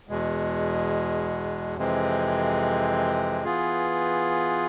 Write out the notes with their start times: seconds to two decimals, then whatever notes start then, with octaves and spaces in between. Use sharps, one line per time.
0.09 E2 B2 G#3
1.76 F2 C3 E3 G#3 C4
3.44 E3 B3 F4 G#4